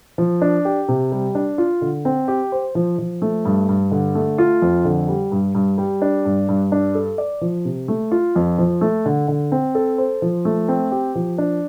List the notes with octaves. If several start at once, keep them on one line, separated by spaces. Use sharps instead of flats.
F3
D4
G4
C3
G3
D4
F4
D3
C4
G4
C5
F3
F3
A3
G2
G2
D3
A3
F4
F2
D3
G3
G2
G2
G3
D4
G2
G2
D4
A4
D5
F3
C3
A3
F4
F2
F3
A3
D3
D3
C4
A4
C5
F3
A3
C4
G4
F3
D4